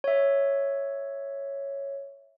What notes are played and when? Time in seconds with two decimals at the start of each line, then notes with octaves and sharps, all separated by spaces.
0.04 C#5 E5